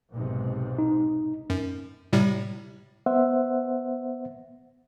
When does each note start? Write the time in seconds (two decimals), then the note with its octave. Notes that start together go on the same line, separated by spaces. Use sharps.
0.12 B1 G#2 C3
0.79 D#4
1.50 F#2
2.13 A2 C3 G3
3.06 B3 C5 E5 F#5